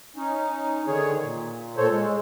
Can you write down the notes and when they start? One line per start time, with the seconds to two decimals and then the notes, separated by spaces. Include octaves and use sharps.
0.16 C#4 D#4
0.87 D3 D#3 G#4 C#5
1.23 A#2
1.77 A#2 A4 C5 C#5
1.91 G#3